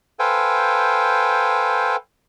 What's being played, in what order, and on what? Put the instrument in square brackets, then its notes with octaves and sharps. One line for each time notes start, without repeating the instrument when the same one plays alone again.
[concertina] A4 B4 C5 F5 G5 G#5